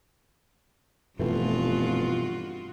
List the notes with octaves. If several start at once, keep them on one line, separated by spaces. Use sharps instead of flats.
F1 G2 B2 E3 A3 F4 F#4